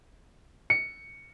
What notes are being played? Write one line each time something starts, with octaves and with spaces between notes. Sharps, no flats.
C#7